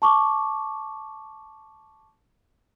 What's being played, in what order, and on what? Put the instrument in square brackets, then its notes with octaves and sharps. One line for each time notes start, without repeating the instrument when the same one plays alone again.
[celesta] A5 C#6 D6